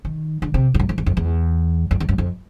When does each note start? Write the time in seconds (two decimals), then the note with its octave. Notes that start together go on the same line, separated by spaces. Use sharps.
0.05 D#3
0.42 D3
0.54 C3
0.74 F2
0.80 F#2
0.89 F2
0.98 E2
1.06 F2
1.17 E2
1.91 F2
2.00 E2
2.09 F#2
2.18 F2